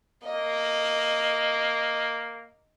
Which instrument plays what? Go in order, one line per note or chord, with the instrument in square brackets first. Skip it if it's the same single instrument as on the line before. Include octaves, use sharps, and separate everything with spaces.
[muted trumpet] A#3 [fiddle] D#5